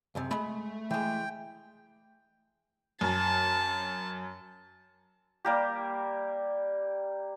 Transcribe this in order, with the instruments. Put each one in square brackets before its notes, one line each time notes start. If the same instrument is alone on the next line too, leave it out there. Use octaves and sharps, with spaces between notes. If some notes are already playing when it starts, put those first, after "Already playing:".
[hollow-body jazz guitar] C#2 F#2 C3
[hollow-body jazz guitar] G#3 B5 [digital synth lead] A3
[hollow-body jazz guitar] E3 G#3 [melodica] G5
[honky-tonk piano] F#2 [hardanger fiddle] A5
[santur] G3 A#3 G4